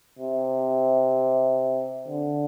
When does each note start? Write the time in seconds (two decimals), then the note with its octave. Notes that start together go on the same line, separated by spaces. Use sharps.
0.19 C3
2.08 D3